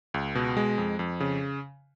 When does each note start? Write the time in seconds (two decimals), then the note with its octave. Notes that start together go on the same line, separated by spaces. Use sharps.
0.14 C#2
0.35 B2
0.57 G#3
0.78 F2
0.99 F2
1.20 C#3